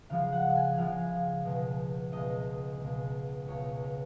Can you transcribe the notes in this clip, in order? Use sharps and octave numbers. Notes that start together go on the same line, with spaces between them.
C#3 F3 G#3 F5
F#5
G#5
C#3 F3 G#3 F5
C#2 B2 G#3
C#2 B2 G#3 D#5
C#2 B2 G#3
C#2 B2 G#3 C#5